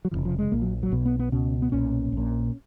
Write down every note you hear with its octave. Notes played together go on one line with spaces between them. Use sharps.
F#3
F1 D#2 C#3 F3
F3
G#3
A#1 A#2 A#3
F#3
F#3
B1 B2
B3
B3
C#2 B2 C#4
B3
B1 A#2 C#4
A#1 A#2